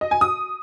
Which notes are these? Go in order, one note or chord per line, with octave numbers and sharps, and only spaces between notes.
D#5
G#5
D#6